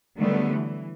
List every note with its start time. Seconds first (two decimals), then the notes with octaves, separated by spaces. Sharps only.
0.18 D3 D#3 F#3 G3 A3 B3
0.51 E3